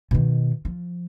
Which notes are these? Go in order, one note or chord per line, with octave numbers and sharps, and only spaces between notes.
B2 D#3
F3